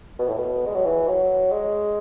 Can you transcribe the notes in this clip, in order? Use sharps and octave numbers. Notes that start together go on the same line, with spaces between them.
B2
A2
B2
G#3
F#3
E3
F#3
G#3